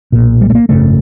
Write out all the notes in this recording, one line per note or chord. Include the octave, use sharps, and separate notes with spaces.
B1 A#2
G3
A3
A#3
G#1 F#2 C#3 A3